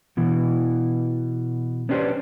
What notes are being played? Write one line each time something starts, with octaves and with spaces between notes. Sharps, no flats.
B2 E3
B3 C#4 D4 G4 B4 C5